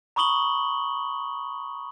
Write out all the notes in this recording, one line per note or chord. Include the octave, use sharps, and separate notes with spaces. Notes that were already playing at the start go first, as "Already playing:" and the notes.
A#5 B5 C#6 D#6 F#7 G7